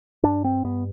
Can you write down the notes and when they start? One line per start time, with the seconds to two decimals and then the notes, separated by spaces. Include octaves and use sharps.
0.23 G2 D4
0.44 C4
0.64 G2 B3